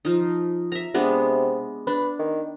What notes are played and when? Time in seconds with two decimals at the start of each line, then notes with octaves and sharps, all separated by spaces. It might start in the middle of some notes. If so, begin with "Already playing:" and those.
0.05 F3 D#4
0.72 E5 A#5
0.94 C3 G#3 B3 D4
1.87 D4 B4
2.19 D#3